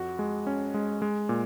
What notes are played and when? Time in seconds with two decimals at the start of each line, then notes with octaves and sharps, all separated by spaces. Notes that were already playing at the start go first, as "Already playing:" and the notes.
Already playing: F2 F#4
0.19 G#3
0.47 C#4
0.74 G#3
1.02 G#3
1.29 A#2